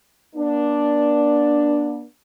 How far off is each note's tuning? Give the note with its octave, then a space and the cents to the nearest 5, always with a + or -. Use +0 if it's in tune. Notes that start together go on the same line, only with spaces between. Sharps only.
B3 -45 D4 +0